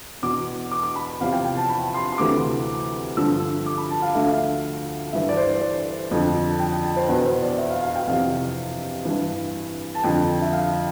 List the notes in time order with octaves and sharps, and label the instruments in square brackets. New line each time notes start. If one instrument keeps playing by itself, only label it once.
[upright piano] E2 B2 D6
D6
D6
B5
E2 C3 F3 F5
G5
G5
A5
B5
C6
C6
D2 C3 E3 D6
G2 D3 F3 E6
D6
B5
A5
F5
D2 D3 F3 E5
F5
E5
G2 E3 E5
D5
C5
C5
D5
F2 D3 F3
A5
G5
G5
A5
C5
E2 B2 B4
C5
D5
E5
F5
F5
G5
F2 C3 E3 F5
G2 E3
A5
F2 D3 F3 G5
E5
F5